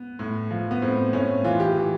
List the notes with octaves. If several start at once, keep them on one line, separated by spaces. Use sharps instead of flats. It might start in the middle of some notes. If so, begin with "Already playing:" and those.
Already playing: B3
A2
F3
B3
A2 C4
A2 C#4
E3 F4
G4
E3